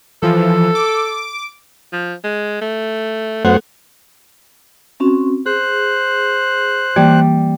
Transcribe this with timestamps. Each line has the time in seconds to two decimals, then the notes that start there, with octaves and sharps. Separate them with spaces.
0.23 E3 F3 A4
0.75 D6
1.93 F3
2.24 G#3
2.61 A3
3.45 F#2 A3 B3 C5 F#5
5.00 C4 C#4 F#4
5.46 G#4 C5 F#6
6.96 E3 G3 A#3